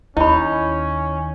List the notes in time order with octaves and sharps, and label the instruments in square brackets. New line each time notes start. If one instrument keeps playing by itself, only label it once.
[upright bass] D#2 [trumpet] C#4 [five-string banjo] D#4 [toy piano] E4 B5